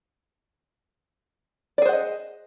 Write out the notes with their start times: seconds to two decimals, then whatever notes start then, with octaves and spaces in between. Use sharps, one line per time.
1.78 D5
1.82 G#4
1.85 C5
1.89 F#5
1.93 D#5